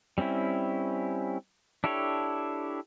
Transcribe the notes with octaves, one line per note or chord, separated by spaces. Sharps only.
G3 C4 C#4 E4
D4 E4 G4 A4 C#5